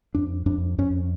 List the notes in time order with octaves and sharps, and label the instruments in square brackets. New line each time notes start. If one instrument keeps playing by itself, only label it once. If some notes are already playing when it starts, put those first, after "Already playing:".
[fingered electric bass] F2 D4
F2 D4
F2 C#4